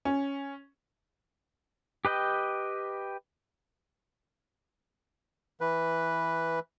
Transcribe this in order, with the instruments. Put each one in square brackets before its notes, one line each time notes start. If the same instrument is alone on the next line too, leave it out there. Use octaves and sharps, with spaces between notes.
[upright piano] C#4
[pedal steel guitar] G4 B4 D#5 G5
[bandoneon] E3 B4